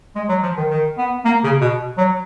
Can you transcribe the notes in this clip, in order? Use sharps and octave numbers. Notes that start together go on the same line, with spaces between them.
G#3
F#3
F3
D#3
D#3
B3
A#3
C#3
B2
F#3